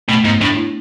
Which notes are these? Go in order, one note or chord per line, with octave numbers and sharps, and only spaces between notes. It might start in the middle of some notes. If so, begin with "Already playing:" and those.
B2 A3
G#2 B3
A2 D4
E4